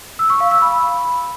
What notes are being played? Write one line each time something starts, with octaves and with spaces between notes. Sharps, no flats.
E6
C#6
F5
E6
B5